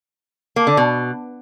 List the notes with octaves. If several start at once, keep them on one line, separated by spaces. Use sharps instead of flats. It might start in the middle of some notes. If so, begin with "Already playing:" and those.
A#3
D3
B2